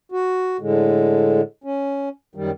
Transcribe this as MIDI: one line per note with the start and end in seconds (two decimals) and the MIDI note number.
0.12 0.57 66
0.60 1.41 45
0.60 1.41 50
0.60 1.41 56
1.64 2.09 61
2.35 2.51 42
2.35 2.51 51
2.35 2.51 55